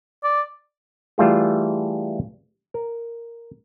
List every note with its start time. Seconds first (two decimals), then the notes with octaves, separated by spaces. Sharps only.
0.23 D5
1.18 E3 G3 A3 F4 G#4
2.74 A#4